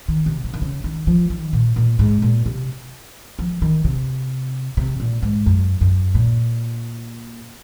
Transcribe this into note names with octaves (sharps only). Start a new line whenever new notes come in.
D#3
C3
C3
D#3
C#3
D#3
F3
D#3
A#2
A#2
G#2
A#2
C3
F3
D#3
C3
C3
A#2
G#2
F#2
F#2
A#2